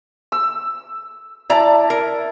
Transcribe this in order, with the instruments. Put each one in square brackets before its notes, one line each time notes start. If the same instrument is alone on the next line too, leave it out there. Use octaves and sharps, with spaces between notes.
[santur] E6
[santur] E4 A5 [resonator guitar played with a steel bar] D5 A#5
[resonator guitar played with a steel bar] A#4